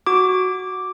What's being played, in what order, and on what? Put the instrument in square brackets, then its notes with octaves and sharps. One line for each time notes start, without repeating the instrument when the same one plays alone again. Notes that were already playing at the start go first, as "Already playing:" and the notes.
[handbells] F#4 D6